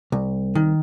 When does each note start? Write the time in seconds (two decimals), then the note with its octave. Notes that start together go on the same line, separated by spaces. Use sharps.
0.12 C2
0.55 D#3